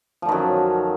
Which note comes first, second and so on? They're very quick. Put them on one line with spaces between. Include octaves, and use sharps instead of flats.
F3 D3 D#3 F#2